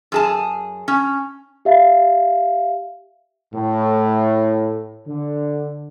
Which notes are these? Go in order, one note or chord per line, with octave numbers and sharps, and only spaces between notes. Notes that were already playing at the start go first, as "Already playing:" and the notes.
F#2 G#4 A5
C#4
G4 E5 F5
A2
D3